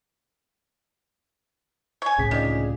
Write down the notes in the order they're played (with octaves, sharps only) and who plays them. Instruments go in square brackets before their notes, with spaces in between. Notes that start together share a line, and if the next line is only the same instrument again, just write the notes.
[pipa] C#5 G#5
[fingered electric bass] C#2 A2 C3 [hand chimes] C#4 B6 [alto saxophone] G#4
[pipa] D#3 [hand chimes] D4 F4 D5